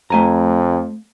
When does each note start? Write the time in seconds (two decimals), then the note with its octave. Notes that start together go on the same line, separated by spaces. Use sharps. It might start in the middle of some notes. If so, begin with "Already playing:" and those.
0.10 F2 A3 G#5 A#5